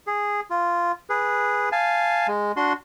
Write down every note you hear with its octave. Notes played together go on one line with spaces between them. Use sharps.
G#4
F4
G#4 B4
F5 G#5 A5
G#3
D4 F#4 C6